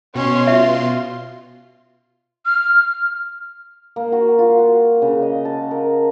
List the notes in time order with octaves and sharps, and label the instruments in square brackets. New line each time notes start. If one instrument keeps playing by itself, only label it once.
[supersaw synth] B2 C6 [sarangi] C#4
[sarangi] F4 [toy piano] E5
[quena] F6
[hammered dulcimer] A#3
F#4
F4
F#4
C#3
D#5
A5
A#4